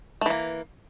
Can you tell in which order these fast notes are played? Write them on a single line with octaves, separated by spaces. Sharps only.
A3 E3 A#3